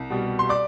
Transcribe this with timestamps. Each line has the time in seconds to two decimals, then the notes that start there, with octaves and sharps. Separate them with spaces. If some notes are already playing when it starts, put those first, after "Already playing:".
Already playing: C2
0.10 B2 G3
0.39 C6
0.49 D5 D6